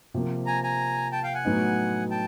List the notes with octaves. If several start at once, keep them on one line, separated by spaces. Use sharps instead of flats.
C3 F3 A#3
G#5 A#5
G#5 A#5
G5 A5
F5 G5
F#5 G#5
A2 F#3 B3 D#4
G5 A5